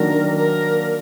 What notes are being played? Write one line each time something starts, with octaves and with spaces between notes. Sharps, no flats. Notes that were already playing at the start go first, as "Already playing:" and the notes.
Already playing: D#3 F#3 A#3 D4 A#4
A#4